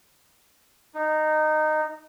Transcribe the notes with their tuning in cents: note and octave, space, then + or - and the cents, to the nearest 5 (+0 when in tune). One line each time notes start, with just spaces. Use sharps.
D#4 -15